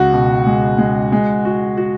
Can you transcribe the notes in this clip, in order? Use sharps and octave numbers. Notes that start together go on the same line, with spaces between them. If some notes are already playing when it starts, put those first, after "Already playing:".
Already playing: C#2 F#4
B2
G#3
G#3
G#3
F#4
F#4